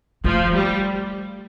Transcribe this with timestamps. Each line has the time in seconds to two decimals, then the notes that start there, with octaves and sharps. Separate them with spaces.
0.24 F3 A3
0.54 G3